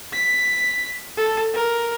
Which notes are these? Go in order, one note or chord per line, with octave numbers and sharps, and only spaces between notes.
B6
A4
A#4